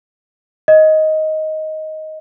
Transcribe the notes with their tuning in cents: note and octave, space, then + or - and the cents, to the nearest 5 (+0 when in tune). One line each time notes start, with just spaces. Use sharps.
D#5 +10